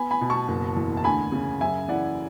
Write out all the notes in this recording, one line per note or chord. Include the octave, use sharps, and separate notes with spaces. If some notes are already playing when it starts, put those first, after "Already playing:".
Already playing: B3 G#5 B5
G#5 B5
B2
A5 C#6
F#1
E2
A5
D2 G#5 B5
C#3
F#2 E5 G#5
E3 D5 F#5